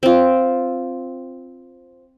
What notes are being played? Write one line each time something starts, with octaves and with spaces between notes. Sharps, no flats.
C4 F4